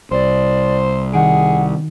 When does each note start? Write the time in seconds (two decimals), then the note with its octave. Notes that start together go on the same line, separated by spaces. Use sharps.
0.11 C2 C5 D5
1.13 D#3 F#4 G#4 F#5 D7